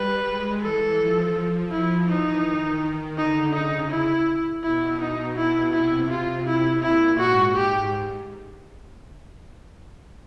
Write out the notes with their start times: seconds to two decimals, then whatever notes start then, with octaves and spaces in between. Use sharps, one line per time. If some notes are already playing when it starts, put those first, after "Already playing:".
Already playing: G3 B4
0.25 G#3
0.62 E3 A4
0.98 F3
1.71 E4
2.07 E3 D#4
2.44 D#3
3.17 D3 D#4
3.54 C#3 D#4
3.90 E4
4.63 B2 E4
5.00 D#4
5.37 E4
5.73 C3 E4
6.10 F4
6.46 C3 E4
6.83 A#2 E4
7.19 G#2 F#4
7.56 G4